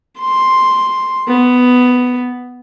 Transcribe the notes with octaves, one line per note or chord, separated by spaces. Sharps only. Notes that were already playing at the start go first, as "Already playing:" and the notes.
C6
B3